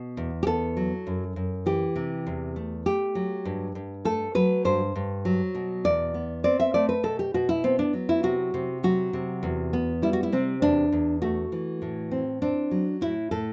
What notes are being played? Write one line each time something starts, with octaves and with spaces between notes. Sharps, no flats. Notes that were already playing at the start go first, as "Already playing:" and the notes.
Already playing: B2
E2
G4
B3 A4
F#3
F#2
F#2
E3 G4
C3
E2
A3
A3 G4
F#3
G2
G2
A3 A4
F#3 B4
G2 C5
G2
F#3
B2
E2 D5
B3
C4 D5
E5
A3 D5
B4
B2 A4
G4
B2 F#4
E4
B3 C4
D4
F#3
E4
C3 F#4
C3
F#3 F#4
C3
E2
B3
G3 E4
F#4
E4
C3 C4
E2 D4
E2
A3 F#4
E3
A2
C4
C4 D4
F#3
A2 E4
A2 A4